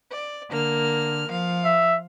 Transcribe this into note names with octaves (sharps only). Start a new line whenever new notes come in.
D5
D3 A#3 F6
F3 F5
E5